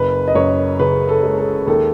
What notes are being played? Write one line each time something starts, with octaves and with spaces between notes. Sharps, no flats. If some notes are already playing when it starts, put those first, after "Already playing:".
Already playing: F#1 B4
D#5
F#2 C#5
C#3 B4
A4
G#3
A4
D#2 A4